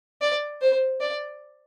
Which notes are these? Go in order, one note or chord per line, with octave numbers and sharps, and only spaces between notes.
D5
C5
D5